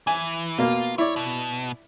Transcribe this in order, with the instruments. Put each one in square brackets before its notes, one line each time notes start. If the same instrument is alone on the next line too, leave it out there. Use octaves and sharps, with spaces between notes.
[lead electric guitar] E3 [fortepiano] G#5
[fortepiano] B2 A#3 [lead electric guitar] F4
[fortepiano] E4 D5 [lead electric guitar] C#5
[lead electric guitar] B2